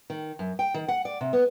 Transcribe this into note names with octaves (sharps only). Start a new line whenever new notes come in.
D#3
F#2
G5
D#3
F#5
D5
C3
B3